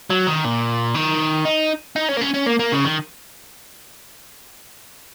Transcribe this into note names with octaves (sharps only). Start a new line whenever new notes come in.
F#3
D#3
A#2
D#3
D#4
D#4
C#4
A#3
C#4
C#4
A#3
A#3
C#3
D#3